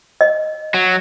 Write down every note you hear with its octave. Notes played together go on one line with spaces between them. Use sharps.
D#5
F#3